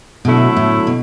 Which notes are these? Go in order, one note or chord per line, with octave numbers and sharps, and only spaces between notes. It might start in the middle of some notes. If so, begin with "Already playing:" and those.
B2 D3 F#3 A3 E4
A2
B2